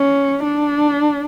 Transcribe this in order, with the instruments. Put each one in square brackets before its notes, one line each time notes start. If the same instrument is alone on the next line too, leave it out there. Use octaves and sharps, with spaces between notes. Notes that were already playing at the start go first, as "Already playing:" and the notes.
Already playing: [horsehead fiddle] C#4
D4